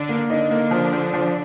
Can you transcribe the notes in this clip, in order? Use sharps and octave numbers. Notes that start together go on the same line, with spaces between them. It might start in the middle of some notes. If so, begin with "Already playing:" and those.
Already playing: D3 D4
A#3
D3 D4 D#4
A#3
F3
F3
F3